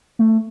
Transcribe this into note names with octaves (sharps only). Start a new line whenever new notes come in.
A3